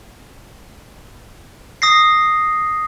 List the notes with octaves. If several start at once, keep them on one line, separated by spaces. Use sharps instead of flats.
D#6 A#6 C7